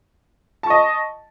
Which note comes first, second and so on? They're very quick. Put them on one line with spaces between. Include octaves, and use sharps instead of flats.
A5 C#6 D#5